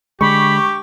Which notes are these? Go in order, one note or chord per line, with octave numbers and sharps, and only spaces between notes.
D3 G#3 G4 B5 C#6